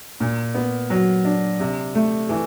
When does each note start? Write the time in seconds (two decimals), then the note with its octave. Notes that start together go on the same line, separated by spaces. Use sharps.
0.20 A#2
0.54 B3
0.90 F#3
1.25 D4
1.60 C3
1.95 A3
2.29 E3